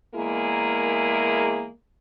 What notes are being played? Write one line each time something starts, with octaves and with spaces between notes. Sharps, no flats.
E2 G#3 A#3 E4 G#4 A#4